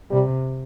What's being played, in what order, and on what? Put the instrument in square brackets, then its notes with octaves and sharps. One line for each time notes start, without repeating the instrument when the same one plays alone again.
[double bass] C3 [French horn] G3